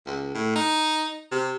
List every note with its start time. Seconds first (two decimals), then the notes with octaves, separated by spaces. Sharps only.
0.06 C#2
0.34 A2
0.56 D#4
1.32 C3